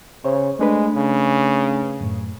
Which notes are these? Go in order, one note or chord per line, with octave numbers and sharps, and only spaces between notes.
C#3 C5 C#5
G#3 A3 D4 B4
C#3
F#2 A2